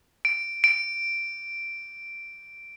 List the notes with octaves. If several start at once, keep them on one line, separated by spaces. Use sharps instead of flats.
D7
D7